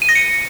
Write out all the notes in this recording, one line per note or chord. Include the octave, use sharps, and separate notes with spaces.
D#7
A#6
C#7